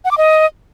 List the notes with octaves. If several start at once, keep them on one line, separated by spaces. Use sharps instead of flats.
F#5
D6
D#5